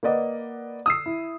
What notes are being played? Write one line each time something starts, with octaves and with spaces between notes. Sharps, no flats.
A#3 B4 D5 D#5 F#5
D#6 E6 C7
E4